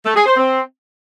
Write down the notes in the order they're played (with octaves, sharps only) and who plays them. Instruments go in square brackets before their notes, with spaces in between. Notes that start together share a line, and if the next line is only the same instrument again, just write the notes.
[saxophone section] A3
G#4
C5
C4